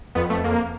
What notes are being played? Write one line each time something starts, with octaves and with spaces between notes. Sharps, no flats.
F2 B3
F2 A3
F2 A#3